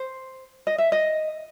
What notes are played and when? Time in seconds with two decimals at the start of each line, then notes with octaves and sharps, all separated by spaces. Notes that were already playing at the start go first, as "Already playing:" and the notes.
Already playing: C5
0.67 D#5
0.78 E5
0.92 D#5